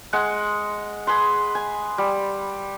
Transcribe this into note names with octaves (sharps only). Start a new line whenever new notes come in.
G#3 F#5
G#4 B4 C6
G#5
G3